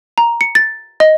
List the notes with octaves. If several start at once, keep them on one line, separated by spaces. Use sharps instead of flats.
A#5
C#7
A6
D#5